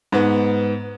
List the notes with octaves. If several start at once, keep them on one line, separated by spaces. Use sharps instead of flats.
G#2 B3